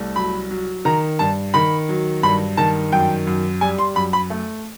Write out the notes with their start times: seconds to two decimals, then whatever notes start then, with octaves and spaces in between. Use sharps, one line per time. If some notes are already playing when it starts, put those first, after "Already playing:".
Already playing: C2 A3
0.16 F#3 B5
0.51 F#3
0.85 D#3 A#5
1.19 G2 A5
1.54 D#3 B5
1.89 F#3
2.23 G2 B5
2.57 D#3 A5
2.92 F#2 G5
3.27 F#2
3.61 G3 G#5
3.78 C6
3.95 F#2 B5
4.13 B5
4.30 A3